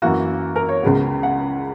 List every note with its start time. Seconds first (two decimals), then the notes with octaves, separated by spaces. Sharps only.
0.02 F#2 E3 A#3 F#4
0.56 A#4
0.69 C#5
0.83 C#2 C#3 G#3 B3
1.23 F#5